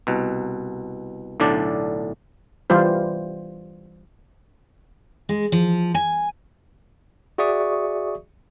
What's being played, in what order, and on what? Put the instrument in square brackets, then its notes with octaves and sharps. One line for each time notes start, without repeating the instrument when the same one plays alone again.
[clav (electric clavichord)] C2 B2
B1 A2 D3 D4 D5
[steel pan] E3 G3 F4 C5
[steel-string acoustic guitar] G#3
F3
G#5
[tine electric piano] F#4 G#4 D5 E5 C#6 D#6